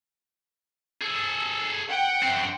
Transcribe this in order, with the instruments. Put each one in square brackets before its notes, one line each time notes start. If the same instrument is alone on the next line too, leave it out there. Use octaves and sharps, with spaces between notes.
[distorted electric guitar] G#4 A4
[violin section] F#5 G5
[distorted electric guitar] F#2 C4